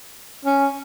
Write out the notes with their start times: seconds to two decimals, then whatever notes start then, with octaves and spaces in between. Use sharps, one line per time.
0.45 C#4